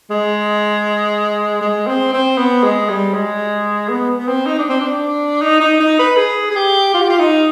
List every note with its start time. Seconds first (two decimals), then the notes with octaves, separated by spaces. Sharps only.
0.10 G#3
1.61 G#3
1.87 C4
2.13 C4
2.38 B3
2.63 G#3
2.89 G3
3.14 G#3
3.89 B3
4.18 B3
4.28 C4
4.46 D#4
4.59 D4
4.69 C4
4.81 D4
5.42 D#4
5.60 D#4
5.80 D#4
5.99 B4
6.17 G#4
6.50 G#4
6.56 G4
6.94 F4
7.01 G4
7.09 F4
7.19 D#4